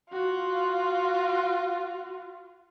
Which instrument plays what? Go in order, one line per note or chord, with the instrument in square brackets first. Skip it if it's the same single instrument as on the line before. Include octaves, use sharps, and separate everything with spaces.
[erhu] F4 [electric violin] F#4